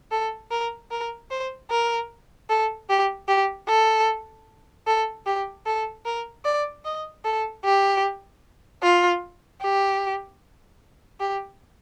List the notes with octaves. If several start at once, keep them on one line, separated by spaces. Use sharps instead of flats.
A4
A#4
A#4
C5
A#4
A4
G4
G4
A4
A4
G4
A4
A#4
D5
D#5
A4
G4
F4
G4
G4